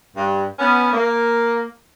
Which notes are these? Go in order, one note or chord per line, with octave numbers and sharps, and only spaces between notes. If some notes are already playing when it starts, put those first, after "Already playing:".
G2
B3 C#4
A#3